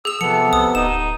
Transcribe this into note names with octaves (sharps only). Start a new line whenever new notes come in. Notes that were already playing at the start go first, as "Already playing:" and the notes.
G#4 E6 F7
C3 F3 B3 A4 C#7
C2 D#6
D1 D#4 E7